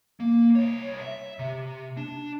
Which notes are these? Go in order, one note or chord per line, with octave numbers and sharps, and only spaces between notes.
A#3
C2 C#5
E5
C3
D4